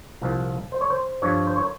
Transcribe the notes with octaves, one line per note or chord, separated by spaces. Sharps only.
C2 A#2 F3
C5
C#5
C5
G2 F3 C#5
C5
C#5